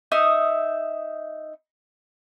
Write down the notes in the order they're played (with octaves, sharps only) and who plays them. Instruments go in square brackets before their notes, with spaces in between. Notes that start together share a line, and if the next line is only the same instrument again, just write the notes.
[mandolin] D#4 E5 D#6